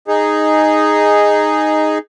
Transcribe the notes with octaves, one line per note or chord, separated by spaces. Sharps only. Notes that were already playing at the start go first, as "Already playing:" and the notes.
D#4 G#4